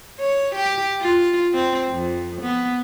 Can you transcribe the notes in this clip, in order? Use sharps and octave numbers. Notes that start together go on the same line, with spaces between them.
C#5
G4
F4
C4
F2
B3